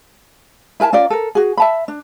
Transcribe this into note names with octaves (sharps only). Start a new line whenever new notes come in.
E4 A#4 G#5 A5
C#4 F4 A#4 D5
A4 A#4
F#4 G#4
E5 A5 B5
D4